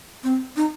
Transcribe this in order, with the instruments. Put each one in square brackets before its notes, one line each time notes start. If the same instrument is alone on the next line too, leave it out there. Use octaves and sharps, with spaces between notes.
[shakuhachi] C4
D#4